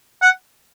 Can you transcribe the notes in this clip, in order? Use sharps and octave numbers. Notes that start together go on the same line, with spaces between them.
F#5